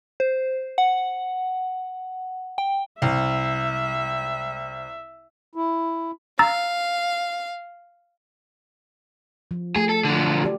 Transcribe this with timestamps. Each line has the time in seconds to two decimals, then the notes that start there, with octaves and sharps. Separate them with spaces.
0.20 C5
0.78 F#5
2.58 G5
3.02 C2 E5
5.55 E4
6.39 F5 A#5 E6 A6
9.51 F3
9.76 A3 G#4
9.89 A4
10.04 D3 F3
10.43 F#4 G4 D5